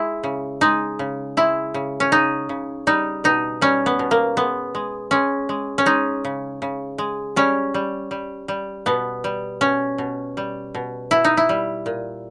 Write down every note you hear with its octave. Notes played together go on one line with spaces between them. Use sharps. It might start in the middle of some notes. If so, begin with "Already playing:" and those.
Already playing: G#3 E4
C#3
G#3 D#4
C#3
G#3 E4
C#3
C#4
C#3 D#4
C#3
G3 D#4
B2 D#4
G3 C#4
B3
B2
A#3
G#3 B3
G#3
G#3 C#4
G#3
C#4
G#3 D#4
C#3
C#3
G#3
G3 C#4
G3
G3
G3
B2 B3
G3
B2 C#4
B2
G3
B2
B2 E4
D#4
E4
G3
A#2